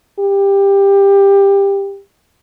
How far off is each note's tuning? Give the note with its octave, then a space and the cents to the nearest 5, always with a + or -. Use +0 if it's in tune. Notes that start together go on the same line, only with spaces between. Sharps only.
G4 +15